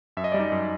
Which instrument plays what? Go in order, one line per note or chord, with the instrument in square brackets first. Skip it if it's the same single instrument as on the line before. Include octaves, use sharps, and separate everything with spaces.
[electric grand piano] F#2 E5
D#5
G3 D5
D#4 D#5
F#2